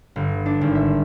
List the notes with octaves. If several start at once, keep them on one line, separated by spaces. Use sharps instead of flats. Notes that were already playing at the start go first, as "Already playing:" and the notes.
G1
D4
G#1
E5